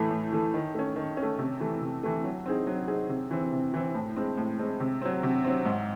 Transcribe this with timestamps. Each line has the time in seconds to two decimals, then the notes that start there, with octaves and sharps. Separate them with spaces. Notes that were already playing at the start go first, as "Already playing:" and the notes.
Already playing: A2 E3 A3
0.11 A2
0.32 E3 A3
0.54 D#3
0.74 A3 C#4
0.96 D#3
1.17 C#4
1.23 A3
1.39 C3
1.60 E3 A3
1.81 C3
2.03 E3 A3
2.24 F#3
2.46 C4 D#4 G#4
2.67 F#3
2.88 C4 D#4 G#4
3.09 C3
3.31 E3 C4
3.53 C3
3.74 E3 C4
3.95 A2
4.16 G#3 C4
4.37 A2
4.59 G#3 C4
4.80 C3
5.01 F#3 C4
5.23 C3
5.44 F#3 C4
5.65 G#2